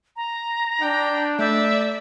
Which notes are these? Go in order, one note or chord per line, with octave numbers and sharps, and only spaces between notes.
A#5
D4 G5
A3 D5 E5 G6